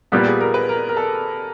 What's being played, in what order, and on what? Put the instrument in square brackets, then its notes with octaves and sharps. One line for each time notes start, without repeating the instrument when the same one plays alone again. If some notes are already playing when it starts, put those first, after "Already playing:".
[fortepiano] A#2 G3 B3 [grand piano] G4
[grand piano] G#4
A#4
B4
A#4
A#4
A4